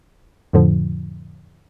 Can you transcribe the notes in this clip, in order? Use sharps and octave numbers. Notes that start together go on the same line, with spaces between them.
F2 A2 D3 F3